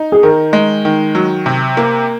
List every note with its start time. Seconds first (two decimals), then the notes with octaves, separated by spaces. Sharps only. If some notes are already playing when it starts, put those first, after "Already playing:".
Already playing: D#4
0.12 G#4
0.23 D#3 A#4
0.53 G#3
0.85 D#3
1.15 F#3
1.46 C3
1.77 A#3